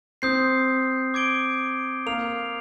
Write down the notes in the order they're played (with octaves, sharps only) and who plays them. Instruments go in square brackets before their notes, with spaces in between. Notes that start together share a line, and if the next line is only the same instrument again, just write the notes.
[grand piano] C4 [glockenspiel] D#6 G6 C7
[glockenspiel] D6 G#6 D7 G7
[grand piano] A#3 [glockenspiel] F6 C7 F7